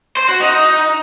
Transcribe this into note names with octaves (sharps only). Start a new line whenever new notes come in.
C5
F#4
D#4